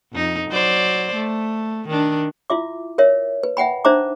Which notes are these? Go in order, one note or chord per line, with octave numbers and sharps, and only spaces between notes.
F2 D#4
F#3 C5 D5
A3
D#3 D4
E4 F4 E5 D6
A#4 C#5 E5
B4
E5 F#5 G5 B5
D4 D#4 C5 E5 A#5 D6